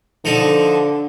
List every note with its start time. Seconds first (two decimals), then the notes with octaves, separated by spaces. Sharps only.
0.25 D3 F3 D#4 A4